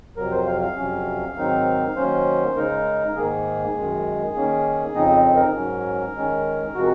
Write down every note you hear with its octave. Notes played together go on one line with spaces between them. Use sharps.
F2 C3 F#3 A#4
C5
F5
F5
F2 C3 F#3 C#4
G#2 D#3 F#3 C4 D#4
D#3 F#3 A#3 C#4 C5
C#3 G#3 D#4 A#4
G#2 D#3 A#3 G#4
F#2 D#3 G#3
D#3 A#3 C#4
F2 C#3 F3 C4 D#4 D#5
A#4
G#2 F#3 C#4
D#3 G#3 C#4
C3 F3 G#3 F#4